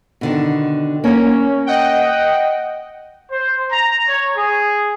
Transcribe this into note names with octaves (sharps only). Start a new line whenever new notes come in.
B2 D3 D#3
A#3 C#4 C#5
D#5 F#5 G5
C5
A#5
C#5
G#4